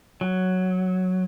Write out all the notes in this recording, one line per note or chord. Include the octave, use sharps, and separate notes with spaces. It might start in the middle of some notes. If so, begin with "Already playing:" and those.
F#3